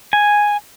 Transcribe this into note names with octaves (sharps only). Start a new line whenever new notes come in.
G#5